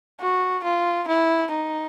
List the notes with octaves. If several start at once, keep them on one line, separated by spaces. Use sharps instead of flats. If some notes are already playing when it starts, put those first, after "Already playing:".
F#4
F4
E4
D#4